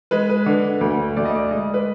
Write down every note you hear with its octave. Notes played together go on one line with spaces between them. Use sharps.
G#3 B4
B4
D3
D2
D2 D5
D#5
D5
G#3 D#5
B4